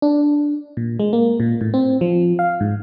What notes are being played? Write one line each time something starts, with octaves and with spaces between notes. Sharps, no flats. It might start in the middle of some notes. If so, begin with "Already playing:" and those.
D4
A#2
G#3
A#3
A#2
A2
C4
F3
F5
G#2